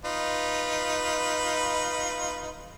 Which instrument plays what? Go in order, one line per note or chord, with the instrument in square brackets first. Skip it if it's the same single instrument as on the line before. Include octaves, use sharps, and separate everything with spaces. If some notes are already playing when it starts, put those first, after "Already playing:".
[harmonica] D#4 F4 B4